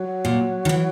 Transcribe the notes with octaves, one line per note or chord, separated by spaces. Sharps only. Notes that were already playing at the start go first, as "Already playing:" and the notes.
Already playing: F#3
A#2
D#3
E3